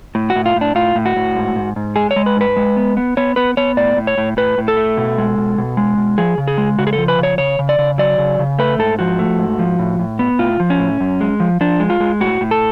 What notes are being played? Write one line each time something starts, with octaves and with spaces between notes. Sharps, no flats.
A2
F#4
A2
F4
A2
D4
A2 F4
A2
F#4
A2
G#2
G#2
G#2
G#3 G#4
C#5
G#3
B4
G#2 B4
G#3
B3
B3
B3 C#5
B3 B4
B3 C#5
A2 D5
A2
C#5
A2
A2 B4
A2
A4
A3
B2
G#3
B2
B2
G#3
B2
F3 G#4
C#3
G#4
G#3
C#3 F#4
G#4
A4
F3
B4
C#3 C#5
C#3 C#5
C#3
D5
C#3
F#3 D5
C#3
C#3
A3 B4
G#2 A4
F3 F#4
A3
G#2
F3
A2
A2
B3
A2 F4
F3
C#4
A2
F#2
G#3
F3
F3 D4
G#3
F4
G#3
A2 F#4
A2
A4